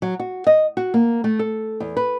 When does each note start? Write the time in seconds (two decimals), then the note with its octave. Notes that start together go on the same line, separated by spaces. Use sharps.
0.02 F#3
0.20 F#4
0.47 D#5
0.77 F#4
0.94 A#3
1.24 A3
1.39 A4
1.80 E2
1.97 B4